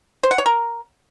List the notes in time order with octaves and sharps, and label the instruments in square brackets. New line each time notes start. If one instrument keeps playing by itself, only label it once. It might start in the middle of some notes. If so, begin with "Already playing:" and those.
[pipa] C5
F#5
C#5
A#4